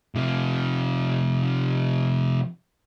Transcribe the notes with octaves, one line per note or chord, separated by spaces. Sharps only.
C3 F3